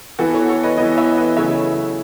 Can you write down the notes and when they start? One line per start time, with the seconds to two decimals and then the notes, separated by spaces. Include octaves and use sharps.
0.19 E3 B3 E4 F#4 A4
0.34 A4 C#5
0.49 A4 C#5
0.63 B4 D#5
0.77 E3 B3 E4 B4 D#5
0.97 C#5 E5
1.17 B4 D#5
1.37 C#3 F#3 A3 E4 C#5 E5